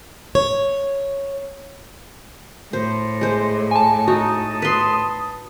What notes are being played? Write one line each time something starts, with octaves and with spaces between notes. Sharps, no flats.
C#5
A2 C5
G#3 C5
G#5 A5
D#4 F#4 A5 D#6
B4 C6